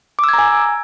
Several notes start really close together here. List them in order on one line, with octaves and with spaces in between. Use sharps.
D6 E6 G#6 A#5 G#5